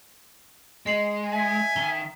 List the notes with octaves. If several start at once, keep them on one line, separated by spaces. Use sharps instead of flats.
G#3 D#5 C7 F#7
E5 G#5
D#3 A#5 G7